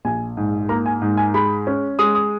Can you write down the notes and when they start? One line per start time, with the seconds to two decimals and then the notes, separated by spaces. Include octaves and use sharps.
0.05 A#1 G#5
0.37 G#2
0.69 A#3 A#5
0.86 G#5
1.02 G#2
1.17 G#5
1.34 G#3 B5
1.67 C#4
1.99 G#3 D#6
2.15 D#6